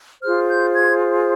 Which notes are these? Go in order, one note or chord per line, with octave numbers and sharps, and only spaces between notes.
F4 G#4 C5 F6
G6
G#6